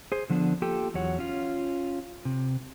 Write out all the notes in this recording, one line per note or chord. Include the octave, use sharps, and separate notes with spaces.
G#4 C5
D3 F3 B3 D4
A#3 F4 G4 A4 G5
E2 F#3 C#5 F#5
C#4 F4
C3